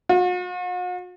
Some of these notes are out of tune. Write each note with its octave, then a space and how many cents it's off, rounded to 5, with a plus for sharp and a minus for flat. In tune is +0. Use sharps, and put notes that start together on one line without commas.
F#4 -45